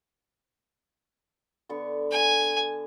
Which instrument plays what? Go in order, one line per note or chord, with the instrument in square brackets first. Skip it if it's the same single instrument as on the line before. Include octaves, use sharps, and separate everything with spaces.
[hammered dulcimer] D3 B3 C#6
[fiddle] G#5